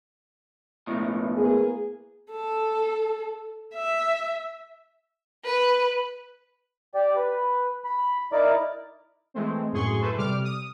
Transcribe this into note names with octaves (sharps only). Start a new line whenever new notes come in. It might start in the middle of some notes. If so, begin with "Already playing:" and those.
B1 A2
A#3 B3 G#4
A4
E5
B4
G4 D5
B4
B5
D#4 E4 A#4 D5 D6
E3 G#3 A3 C4
F#2 A2 G#4 C6 C#6
A4 B4 C5 E5
C3 G3 D6 F6
D#6